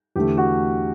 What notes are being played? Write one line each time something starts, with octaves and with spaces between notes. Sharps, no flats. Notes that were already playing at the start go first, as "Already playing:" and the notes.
E2 D3 A3 G4
F#4